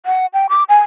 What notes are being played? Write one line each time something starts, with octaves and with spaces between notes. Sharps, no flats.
F#5
G5
D6
G#5